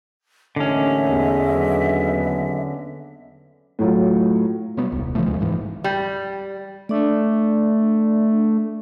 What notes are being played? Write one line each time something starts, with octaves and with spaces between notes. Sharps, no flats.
A1 D#2 D3 C#4 D#5 E5
E2
D#2 F#3 B3
A2 F#3 F4
B2 F#3 G3 B3
D#1 C2
C#3 E3 F3 A3
D2 F3 G#3
D1 G#2 E3
G3
A3 D4 D5